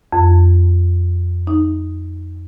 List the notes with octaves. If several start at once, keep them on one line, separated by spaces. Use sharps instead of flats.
F2
D#4